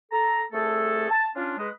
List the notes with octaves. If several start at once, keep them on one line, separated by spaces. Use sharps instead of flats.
A4 A#5
C2 A3 G#4 A4
A5
C#4 D4 F4
G#3 B4 D#5